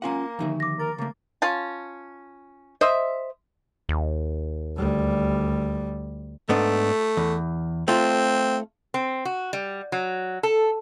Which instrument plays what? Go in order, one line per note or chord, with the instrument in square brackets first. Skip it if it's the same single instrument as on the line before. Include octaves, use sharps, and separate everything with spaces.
[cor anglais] A#3 [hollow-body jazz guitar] C#4 F4 F#5 [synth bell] F5 G#5 A#5
[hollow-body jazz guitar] D#2 D#4 E5 [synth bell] D3 F3
[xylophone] D6 A#6
[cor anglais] A#4 [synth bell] A6
[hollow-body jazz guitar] C#3 A3 [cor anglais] A#3
[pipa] C#4 F4 A5
C5 D#5 E5
[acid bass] D#2
[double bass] D2 G3
[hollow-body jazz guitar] G#2 B3 D4 [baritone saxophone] A3
[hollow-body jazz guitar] E2
[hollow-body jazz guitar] A3 F4 [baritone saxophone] C4
[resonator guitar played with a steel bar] C4
F#4
G3
F#3
A4